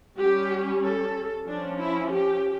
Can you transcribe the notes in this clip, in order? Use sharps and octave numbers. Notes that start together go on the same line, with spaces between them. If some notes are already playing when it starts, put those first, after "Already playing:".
G3 C#4 G4
A4
F3 C#4 D4
E4
G4